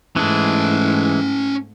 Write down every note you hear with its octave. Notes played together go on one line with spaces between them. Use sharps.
G#2 E3 G#3 A3 C#4 A5